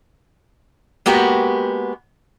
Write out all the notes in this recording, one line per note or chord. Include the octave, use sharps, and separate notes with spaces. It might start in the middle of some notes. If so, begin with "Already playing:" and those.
G#3 A#3 B3 F#4 G4